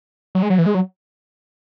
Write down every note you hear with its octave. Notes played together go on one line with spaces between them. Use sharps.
F#3
G#3
F#3
E3
G#3
F#3